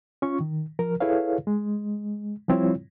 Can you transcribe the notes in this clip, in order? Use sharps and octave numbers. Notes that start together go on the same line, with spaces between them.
C#4 F4 C#6
D#3
F3 A#4
E4 G#4 A4 B4 C#5 F5
G#3
F3 G3 C4 E4 F4 C#5